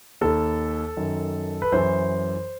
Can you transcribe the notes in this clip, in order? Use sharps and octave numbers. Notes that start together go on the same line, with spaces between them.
D#2 D#3 A4
F#2 D#3
B4
F#2 E3 C5